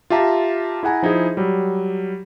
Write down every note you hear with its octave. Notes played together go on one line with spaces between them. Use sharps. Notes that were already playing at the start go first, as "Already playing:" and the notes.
F4 G4 E5 A5 A#5
E4 G#4 F#5 G#5 A#5
F3 D#4 E4 G#4
F#3 G3